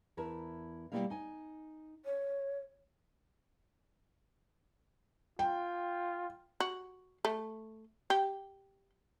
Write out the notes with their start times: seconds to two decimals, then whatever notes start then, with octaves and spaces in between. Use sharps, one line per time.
0.17 E2 E4 A#4 A5
0.92 B2 F3 G3 A#3 E4 F5
1.10 D#4 G#5
2.05 C#5
5.39 F4 G5
6.60 F#4
7.25 A3
8.10 G4